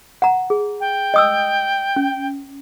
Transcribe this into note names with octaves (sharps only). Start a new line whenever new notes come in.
F#5 A#5
G#4
G5
D#5 D#6 E6
C#4